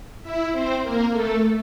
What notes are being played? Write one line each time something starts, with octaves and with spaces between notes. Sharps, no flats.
E4 E5
C4 C5
A#3 A#4
A3 A4